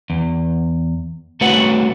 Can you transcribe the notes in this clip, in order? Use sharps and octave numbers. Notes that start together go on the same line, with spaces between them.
E2
C2 A3 F#4 B4 C#5 F#5